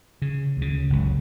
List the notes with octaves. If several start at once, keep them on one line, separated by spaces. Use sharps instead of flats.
C#3
D2 C#3
F#1 C#2